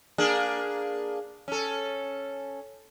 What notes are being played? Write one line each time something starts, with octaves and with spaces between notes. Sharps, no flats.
A#3 D4 G#4
C#4 A4